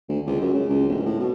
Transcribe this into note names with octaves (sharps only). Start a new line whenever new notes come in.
D2
C#2
F#2
C#3
C#2
D1
A2
B2